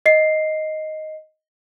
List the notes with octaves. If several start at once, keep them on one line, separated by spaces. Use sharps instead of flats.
D#5 C7